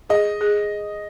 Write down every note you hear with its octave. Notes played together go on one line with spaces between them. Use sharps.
G#4 D#5
G#4